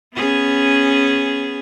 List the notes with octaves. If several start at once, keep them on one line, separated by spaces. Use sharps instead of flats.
B3 C#4 G#4